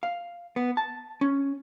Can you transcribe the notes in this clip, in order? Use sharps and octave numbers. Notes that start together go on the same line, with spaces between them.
F5
B3
A5
C#4